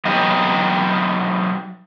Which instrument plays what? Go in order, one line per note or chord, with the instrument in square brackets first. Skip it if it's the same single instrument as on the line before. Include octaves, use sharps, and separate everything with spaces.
[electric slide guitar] F#3 B3 D#4 G4 D#5